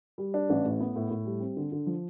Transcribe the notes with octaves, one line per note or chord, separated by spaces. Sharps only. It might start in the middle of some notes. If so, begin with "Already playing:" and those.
G3
D4
A1
A2
B3
A2
A2
G3
C4
D3
D3
F3